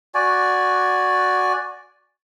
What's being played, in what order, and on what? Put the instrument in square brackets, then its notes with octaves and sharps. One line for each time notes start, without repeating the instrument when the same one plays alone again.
[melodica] F#4 D5 G#5